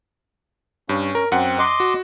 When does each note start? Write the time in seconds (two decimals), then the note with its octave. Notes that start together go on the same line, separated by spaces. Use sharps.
0.89 G2 C#4
1.15 A#4
1.32 F#2 C4 F#5
1.59 D#5 C6 D6
1.80 F#4